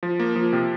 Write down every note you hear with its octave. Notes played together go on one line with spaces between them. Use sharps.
F3
A#3
F3
C3